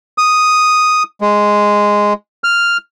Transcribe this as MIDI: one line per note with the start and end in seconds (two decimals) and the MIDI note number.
0.18 1.03 87
1.21 2.13 56
2.44 2.77 89